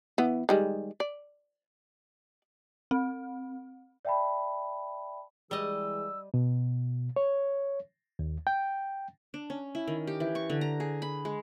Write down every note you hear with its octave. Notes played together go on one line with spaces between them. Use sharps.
E3 B3
D#3 G3 G#3
D5
C4
D5 E5 G5 A5 B5
E3 G3 G#3 G#4 D#5 E6
B2
C#5
D#2
G5
D4
C#4
E4
D#3
G4
E3
C#6
D3
A#5
G#4
B5
G#3